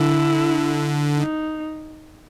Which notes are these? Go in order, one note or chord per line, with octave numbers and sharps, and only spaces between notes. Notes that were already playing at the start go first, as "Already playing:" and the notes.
Already playing: D3 E4
D#4